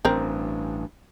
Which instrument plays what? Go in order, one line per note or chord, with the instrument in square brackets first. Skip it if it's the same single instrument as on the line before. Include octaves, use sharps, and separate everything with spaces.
[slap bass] A1 [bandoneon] G2 [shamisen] C4 A#4